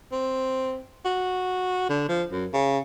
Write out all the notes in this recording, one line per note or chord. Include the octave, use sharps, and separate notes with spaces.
C4
F#4
D3
F3
F#2
C#3